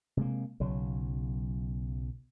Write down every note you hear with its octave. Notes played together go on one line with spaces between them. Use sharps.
C3 G#3 A#3
B1 C#3 F#3